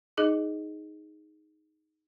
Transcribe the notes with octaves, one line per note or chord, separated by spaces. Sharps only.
D#4 G#4 D#5 D6